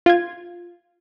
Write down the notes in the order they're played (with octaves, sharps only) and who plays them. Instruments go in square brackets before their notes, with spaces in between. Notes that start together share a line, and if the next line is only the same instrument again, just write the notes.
[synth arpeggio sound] F4 G#6